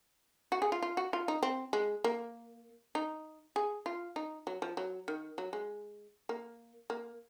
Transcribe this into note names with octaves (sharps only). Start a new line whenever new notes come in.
F#4
G#4
F4
F4
F#4
F4
D#4
C4
G#3
A#3
D#4
G#4
F4
D#4
F#3
F3
F#3
D#3
F#3
G#3
A#3
A#3